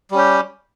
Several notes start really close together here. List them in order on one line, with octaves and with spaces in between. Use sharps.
G3 C#4 G4